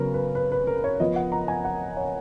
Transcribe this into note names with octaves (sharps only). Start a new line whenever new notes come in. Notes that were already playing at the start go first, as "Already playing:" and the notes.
Already playing: C#3 F#3 B3 A#4
B4
B4
B4
A#4
C#5
F3 B3 D#5
F#5
A#5
G#5
F#5
C#5